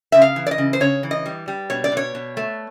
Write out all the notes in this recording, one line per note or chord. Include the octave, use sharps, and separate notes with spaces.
C#3 E5
F5
E3
D5
D#5
C#3
C5
C#3 C#5
E3
D#5
G3
G3
B2 C#5
D5
B2 C#5
B2
A3